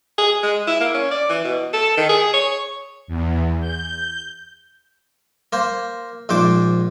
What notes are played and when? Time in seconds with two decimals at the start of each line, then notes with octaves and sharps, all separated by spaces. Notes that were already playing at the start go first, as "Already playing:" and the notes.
0.18 G#4
0.43 G#3
0.67 E4
0.80 A#3
0.94 C#4
1.11 D5
1.29 E3
1.44 B2
1.73 A4
1.97 D#3
2.09 G#4
2.33 C#5
3.07 E2
3.59 G6
5.53 A#3 C5
6.29 A#1 G#2 C5 D6